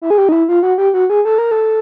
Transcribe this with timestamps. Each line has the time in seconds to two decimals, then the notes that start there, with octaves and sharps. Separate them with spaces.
0.02 E4
0.10 G#4
0.18 G4
0.29 D#4
0.32 E4
0.49 F4
0.63 F#4
0.78 G4
0.94 F#4
1.10 G#4
1.25 A4
1.38 A#4
1.51 A4